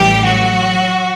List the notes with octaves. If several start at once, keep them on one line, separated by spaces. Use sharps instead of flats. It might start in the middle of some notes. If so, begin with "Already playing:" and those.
Already playing: A1 A2 E3 G3 G4
F#3 F#4